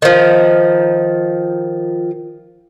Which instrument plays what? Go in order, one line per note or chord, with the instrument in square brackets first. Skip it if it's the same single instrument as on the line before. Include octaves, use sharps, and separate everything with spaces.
[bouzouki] D#3 F3